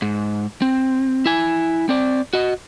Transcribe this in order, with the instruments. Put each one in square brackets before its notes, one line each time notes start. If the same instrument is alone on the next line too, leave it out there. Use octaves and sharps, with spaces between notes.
[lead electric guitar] G#2
C4
E4 G#5
C4 D5
F#4 D#5